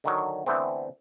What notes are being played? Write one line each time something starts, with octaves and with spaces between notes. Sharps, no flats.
D3 D#3 F#3
D3 E3 A3 B3 C4